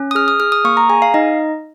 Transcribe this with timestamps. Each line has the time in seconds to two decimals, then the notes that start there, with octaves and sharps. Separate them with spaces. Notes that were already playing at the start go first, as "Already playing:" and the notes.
Already playing: C#4
0.11 D#6
0.15 G#4 F6
0.28 D#6
0.40 G#4 F6
0.52 D#6
0.64 A#3 C#6
0.77 A#5
0.89 G#4 G#5
1.02 F5
1.14 D#4 D#5